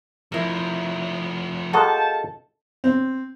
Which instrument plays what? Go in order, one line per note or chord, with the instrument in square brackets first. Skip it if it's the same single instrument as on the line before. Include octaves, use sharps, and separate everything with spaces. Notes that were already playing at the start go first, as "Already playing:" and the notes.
[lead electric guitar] F3 A3 [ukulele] E4 A#4
[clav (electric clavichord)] G#3 A#3 F#4 [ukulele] A4 [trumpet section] F5 G5 A5
[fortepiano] C4